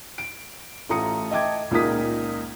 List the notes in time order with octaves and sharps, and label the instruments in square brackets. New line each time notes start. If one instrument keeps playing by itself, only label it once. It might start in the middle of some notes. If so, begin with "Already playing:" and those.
[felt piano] D7
A1 A3 F4 A#5 D#6 C#7
D#5 E5 G5 A5 D6 G#6
C#2 A#2 D#4 A#4 D#6 B6